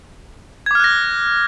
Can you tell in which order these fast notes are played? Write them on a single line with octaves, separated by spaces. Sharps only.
G#6 D6 F6 F#6 A#6